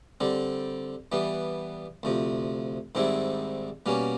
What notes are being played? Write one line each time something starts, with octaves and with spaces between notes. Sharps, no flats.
D3 G3 C4
E3 G3 B3
D2 C3 F3
G#2 D#3 G3 C4 E4
B2 G3 A#3 C#4